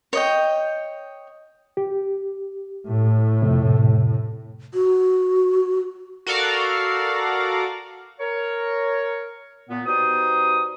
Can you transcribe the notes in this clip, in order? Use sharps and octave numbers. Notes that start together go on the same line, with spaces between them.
C#5 D#5 G5
G4
A2
F2 C3
F#4
F#4 A4 A#4 D5 F5
A#4 C#5
A#2 B3
B2 G3 D#4 C5 D#6